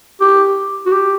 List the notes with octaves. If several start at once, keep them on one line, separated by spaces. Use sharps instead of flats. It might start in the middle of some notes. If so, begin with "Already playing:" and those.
G4
F#4
G4